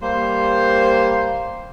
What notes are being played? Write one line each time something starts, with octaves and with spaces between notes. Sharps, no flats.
G3 A#3 C5